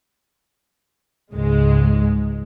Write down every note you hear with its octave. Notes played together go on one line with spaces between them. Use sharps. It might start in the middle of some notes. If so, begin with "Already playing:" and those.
C#2 G#2 G#3